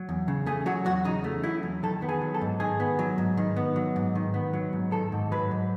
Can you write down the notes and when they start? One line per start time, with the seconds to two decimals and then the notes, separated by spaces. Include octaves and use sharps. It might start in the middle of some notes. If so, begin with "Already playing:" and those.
Already playing: F#3
0.09 E2
0.28 C#3
0.46 A3 G#4
0.66 F#3 F#4
0.86 E2 F#4
1.05 C#3 D#4
1.24 A3
1.44 F#3 E4
1.63 E2
1.83 D#3 A4
2.02 B3
2.09 G#4
2.21 F#3
2.34 A4
2.41 G#2
2.60 D#3 G#4
2.80 B3
2.99 F#3
3.18 G#2
3.37 D#3
3.56 B3
3.76 F#3
3.96 G#2
4.15 D#3
4.34 B3
4.53 F#3
4.73 G#2
4.92 D#3 A4
5.12 G#2
5.32 F#3 B4
5.51 G#2